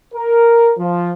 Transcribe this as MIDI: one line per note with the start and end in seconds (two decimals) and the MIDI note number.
0.14 0.72 70
0.78 1.11 53